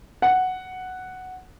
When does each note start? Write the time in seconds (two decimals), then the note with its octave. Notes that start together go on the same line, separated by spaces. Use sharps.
0.22 F#5